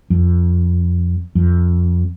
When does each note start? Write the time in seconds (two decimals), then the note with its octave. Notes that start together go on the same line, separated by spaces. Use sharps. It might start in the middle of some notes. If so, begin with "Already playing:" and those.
0.10 F2
1.35 F2